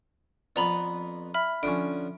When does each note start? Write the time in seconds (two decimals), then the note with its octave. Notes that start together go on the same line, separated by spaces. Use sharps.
0.56 F2 B3 D5 A#5 B5
1.34 E5 B5 F6
1.63 D3 F3 C#4 D7